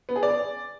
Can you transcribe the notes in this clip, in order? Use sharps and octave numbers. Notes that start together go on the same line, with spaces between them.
B3
G#4
D5